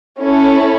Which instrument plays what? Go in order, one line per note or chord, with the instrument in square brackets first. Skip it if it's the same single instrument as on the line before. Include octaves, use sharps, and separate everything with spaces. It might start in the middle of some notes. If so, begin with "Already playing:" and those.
[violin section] C#4 E4 A4